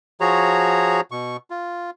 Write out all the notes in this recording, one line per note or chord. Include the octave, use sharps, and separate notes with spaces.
F3 F#4 G#4 C#5 A#5
B2 C#6
F4